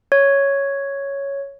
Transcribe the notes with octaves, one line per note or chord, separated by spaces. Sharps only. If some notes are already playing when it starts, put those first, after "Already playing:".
C#5